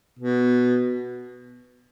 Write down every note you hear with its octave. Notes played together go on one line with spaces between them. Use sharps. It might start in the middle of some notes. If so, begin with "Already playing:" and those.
B2